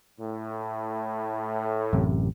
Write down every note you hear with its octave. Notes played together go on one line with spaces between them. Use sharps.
A2
A1 F#2 C3